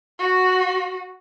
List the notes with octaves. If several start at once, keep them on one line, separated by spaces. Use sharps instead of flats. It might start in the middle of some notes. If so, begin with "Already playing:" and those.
F#4